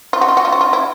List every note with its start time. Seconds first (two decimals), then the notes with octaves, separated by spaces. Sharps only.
0.13 F4
0.21 F#4
0.28 F4
0.37 F#4
0.45 F4
0.52 F#4
0.61 F4
0.73 E4